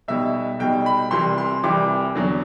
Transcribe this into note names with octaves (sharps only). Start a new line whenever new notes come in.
B1 B2 G3 E5
B1 B2 G3 G5
B5
C2 C3 E3 G3 C6
C6
C2 C3 E3 G3 D6
E2 D3 F#3